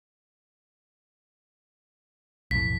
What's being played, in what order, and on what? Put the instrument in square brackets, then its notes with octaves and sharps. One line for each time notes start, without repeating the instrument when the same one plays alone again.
[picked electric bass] B1 F2 A2 [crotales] B6